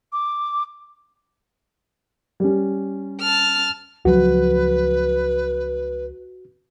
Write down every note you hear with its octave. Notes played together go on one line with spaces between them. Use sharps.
D6
G3 C#4
A5 F6
C#2 F3 F#3 F#4 B4